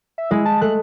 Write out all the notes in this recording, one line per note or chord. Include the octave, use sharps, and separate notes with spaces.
E5
G#3 E4
A5
A3 F#6